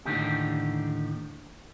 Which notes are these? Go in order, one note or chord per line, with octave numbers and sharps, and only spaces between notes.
D#2 A2 D3 D4 D#4 G4